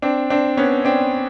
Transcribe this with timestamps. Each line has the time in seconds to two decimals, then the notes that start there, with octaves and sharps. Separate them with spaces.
0.02 C4 D4
0.30 C4 D4
0.57 B3 C#4
0.85 C4 D4